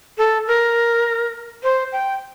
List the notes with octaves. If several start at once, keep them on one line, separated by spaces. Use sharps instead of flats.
A4
A#4
C5
G5